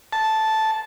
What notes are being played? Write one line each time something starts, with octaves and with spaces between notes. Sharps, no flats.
A5